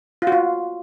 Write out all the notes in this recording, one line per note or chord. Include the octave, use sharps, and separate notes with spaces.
F4
F#4
F4